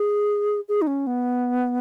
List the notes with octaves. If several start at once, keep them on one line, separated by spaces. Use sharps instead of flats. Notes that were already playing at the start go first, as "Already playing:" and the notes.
Already playing: G#4
G#4
D#4
C#4
B3